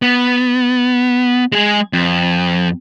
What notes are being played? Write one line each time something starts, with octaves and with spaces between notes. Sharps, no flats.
B3
G#3 G#4
F2